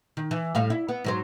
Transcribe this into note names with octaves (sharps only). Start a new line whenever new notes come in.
D#3
E3
A2 G3 F5
E4
B3
G#2 F#3 C5